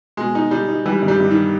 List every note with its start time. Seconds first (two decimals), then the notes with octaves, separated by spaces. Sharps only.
0.17 B2 G#3
0.35 D#4
0.51 G3 D#4
0.69 D#4
0.86 E3 G3
1.02 G2
1.08 G3
1.20 G2
1.31 D#3